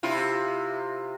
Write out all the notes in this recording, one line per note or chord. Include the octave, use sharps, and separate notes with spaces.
C3 E4 F4